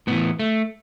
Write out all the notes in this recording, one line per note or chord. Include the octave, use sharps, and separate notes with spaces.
A2 E3 B3
A3